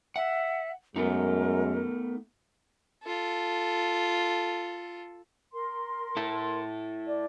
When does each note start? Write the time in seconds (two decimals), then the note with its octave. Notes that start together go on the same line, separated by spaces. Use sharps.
0.16 E5 F#5
0.96 F#2 G#3 A3 B3 D#4 A#4
3.04 F4 A4
5.52 A#4 C6
6.17 E4 A4
7.07 D5